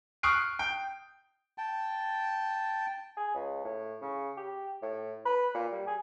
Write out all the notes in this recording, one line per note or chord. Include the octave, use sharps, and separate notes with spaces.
C#6 D#6 F6 F#6 C7 D7
G5
G5 A5
G#4
C#2
A2
C#3
G4
A2
B4
A#2
G3
G#4